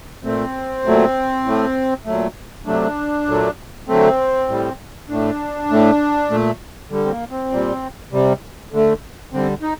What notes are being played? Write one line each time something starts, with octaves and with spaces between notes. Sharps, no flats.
A#2 A3 C4
A#2 F#3 A3
A2 A3
A#2 F#3 A3
C3 F#3 A3 D4
A#2 F#3 A3
D3 F#3 A3 C4
A2 G3
A2 A3 D4
A2 A3
A#2 A3
D3 G3
C4
A#3
C4
A#2 G3
C3 G3
D3 A3
D3 G3 C4
D#4